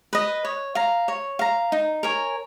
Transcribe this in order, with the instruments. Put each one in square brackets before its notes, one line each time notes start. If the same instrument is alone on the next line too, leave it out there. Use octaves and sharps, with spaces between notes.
[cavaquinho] B4 D#5
C#5
F5 A#5
C#5
F5 A#5
D#4
A#4 C#5 G#5